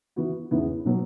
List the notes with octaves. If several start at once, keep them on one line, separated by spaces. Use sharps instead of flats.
E3 B3 F#4
E2 C#3 E3 B3
B2 F#3 B3